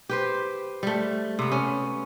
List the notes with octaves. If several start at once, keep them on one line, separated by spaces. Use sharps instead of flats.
G4 B4 C5
G3 A3
C3 B3
C#4